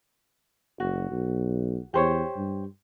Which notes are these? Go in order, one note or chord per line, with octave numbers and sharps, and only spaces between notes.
F#1 F#4
B1
E2 G4 C5 C#5
G2